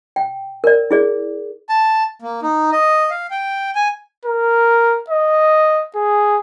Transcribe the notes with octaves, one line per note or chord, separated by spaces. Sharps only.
G5
A#4 D5
E4 G#4 D5
A5
A#3
D#4
D#5
F5
G5
G#5
A#4
D#5
G#4